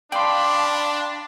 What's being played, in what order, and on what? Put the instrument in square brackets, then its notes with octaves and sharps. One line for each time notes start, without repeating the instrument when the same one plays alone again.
[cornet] D4 [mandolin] D5 [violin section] F5 A5 B5 [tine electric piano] G5 C6